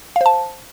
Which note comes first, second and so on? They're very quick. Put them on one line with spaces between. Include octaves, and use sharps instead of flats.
F5 C5 A5